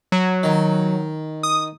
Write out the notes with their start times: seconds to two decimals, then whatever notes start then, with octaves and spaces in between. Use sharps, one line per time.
0.12 F#3
0.43 D#3
1.43 D#6